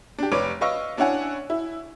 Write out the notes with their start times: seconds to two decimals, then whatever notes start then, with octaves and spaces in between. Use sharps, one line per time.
0.19 D4 G4
0.32 F1 B4 C#5 D6 D7
0.61 B4 D#5 F5 C#6 E6 A#6
0.97 C#4 D4 E4 C#5 F#5 G#5
1.50 E4